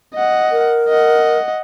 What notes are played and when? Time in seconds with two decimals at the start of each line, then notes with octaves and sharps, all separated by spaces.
0.14 D#5 F#5
0.52 A#4
0.89 D#5 F#5